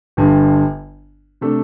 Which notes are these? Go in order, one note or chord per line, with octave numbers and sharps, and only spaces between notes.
G1 G2 D3
C3 A3 D4 A4